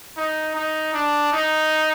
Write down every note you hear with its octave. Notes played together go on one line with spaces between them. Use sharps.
D#4
D#4
D4
D#4